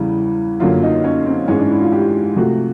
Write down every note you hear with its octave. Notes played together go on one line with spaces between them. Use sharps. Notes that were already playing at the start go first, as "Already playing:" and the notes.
Already playing: E2 C#3 E3 G3
F#2 D3 F#3 A#3 F4
D#4
C#4
C4
G#2 E3 G#3 C#4
D4
E4
F4
G4
C3 F3 A3 F#4